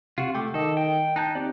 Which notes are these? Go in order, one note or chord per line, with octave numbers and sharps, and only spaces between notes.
C3 F4 F#4
A3 G5 D6
D#3 A4 D#5
G5
D#4 A5 F#6 G6
C4 D#4 G4 D5